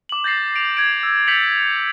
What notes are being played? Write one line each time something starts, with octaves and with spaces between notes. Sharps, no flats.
D6 F#7
G6 A6 A#6 C7
D7 F7
G#6 D7
E6
G6 A6 B6 C#7 F7 F#7